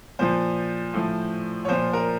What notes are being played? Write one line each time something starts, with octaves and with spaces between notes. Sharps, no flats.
A#2 F3 C5
A2 F3
C#5
A#2 F3 C5
A#4